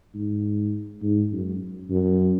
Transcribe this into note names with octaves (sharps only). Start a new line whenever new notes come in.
G#2
G#2
F#2
F#2